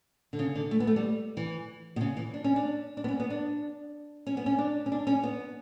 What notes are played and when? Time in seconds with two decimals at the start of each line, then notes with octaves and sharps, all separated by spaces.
0.33 D3
0.39 C#3
0.55 D3
0.71 A3
0.80 B3
0.87 A3
0.96 G3
1.37 E3
1.96 B2
2.01 C#3
2.17 E3
2.34 D4
2.44 C#4
2.56 D4
2.97 D4
3.04 B3
3.08 C#4
3.20 B3
3.30 D4
4.27 C#4
4.37 B3
4.46 C#4
4.58 D4
4.86 C#4
4.92 D4
5.07 C#4
5.23 B3